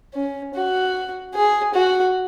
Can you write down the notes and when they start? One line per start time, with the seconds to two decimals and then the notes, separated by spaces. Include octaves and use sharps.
0.14 C#4
0.54 F#4
1.34 G#4
1.74 F#4